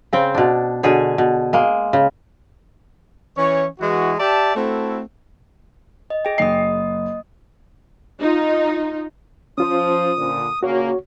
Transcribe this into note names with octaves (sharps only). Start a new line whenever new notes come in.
C#3 C4 G5
B2 D4
B2 D3 G#4 C#5
B2
G#3 A#3
C#3
E3 C#4 C#5
E3 G#3 E4 F#4
G4 D5 E5 A5
A3 C4 E4 F#4 A4
D#5
G#4 G5
F#1 D#5 D#6 C7
D#4 F4
F3 C#4 F4 C5 D#6
A#2 D3
A#2 C#3 A#3 F#4 C#5